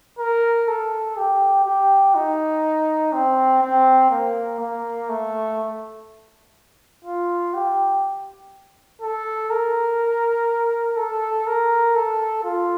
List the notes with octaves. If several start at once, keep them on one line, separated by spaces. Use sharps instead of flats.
A#4
A4
G4
G4
D#4
C4
C4
A#3
A#3
A3
F4
G4
A4
A#4
A4
A#4
A4
F4